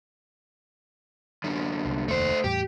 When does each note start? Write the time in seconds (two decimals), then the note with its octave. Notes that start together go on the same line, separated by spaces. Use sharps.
1.44 F#2 D3
1.85 C2
2.08 F1 D#2 A3 C5
2.44 E2 A2 G3 G4